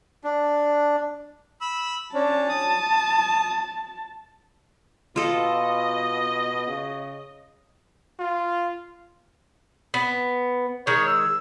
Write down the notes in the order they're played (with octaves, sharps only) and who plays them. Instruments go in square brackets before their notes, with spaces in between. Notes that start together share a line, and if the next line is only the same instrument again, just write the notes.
[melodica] D4
[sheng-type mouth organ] B5 E6
[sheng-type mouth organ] C#4 D4 [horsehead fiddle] A5
[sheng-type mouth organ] D#6
[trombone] B2 [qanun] F4 A4 [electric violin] D#5
[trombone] C#3
[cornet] F4
[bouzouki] B3
[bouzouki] D#3 G#3 [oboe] C#5
[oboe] E6